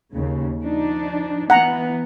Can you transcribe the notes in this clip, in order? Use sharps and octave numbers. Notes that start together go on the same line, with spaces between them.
D#2 C#3
F3 D4 D#4
E3 B3 F#5 A#5